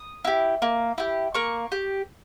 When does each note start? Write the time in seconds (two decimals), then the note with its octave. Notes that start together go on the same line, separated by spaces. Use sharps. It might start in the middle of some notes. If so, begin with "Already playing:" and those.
Already playing: D#6
0.25 E4 G4
0.62 A#3
0.98 E4 G4
1.34 A#3 C#6
1.72 G4